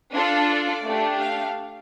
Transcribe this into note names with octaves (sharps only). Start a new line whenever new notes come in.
D4 F4 A4
D5
A3 D4 G4
F5